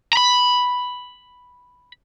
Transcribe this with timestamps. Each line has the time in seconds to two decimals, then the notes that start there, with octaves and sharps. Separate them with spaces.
0.13 A#5 B5